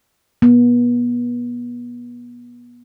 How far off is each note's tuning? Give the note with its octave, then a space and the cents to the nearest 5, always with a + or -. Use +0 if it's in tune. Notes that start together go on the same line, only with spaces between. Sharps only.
B3 -30